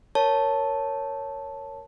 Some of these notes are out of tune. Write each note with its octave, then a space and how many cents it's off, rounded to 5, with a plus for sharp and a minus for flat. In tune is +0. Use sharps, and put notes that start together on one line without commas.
A#4 +0 C#5 +0 A5 +0